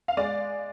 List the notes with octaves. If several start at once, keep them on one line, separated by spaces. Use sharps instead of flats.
F5
G#3 D5